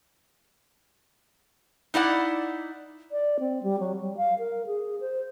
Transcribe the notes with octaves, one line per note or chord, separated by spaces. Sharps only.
D#4 E4 D5 F#5
D5
C4
G3
F#3
G3
F5
A#4
G#4
C5